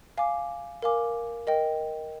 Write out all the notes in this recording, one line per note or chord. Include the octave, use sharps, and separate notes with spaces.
F5 G#5 D6
A#4 F5 G#5 D6
A#4 D#5 G5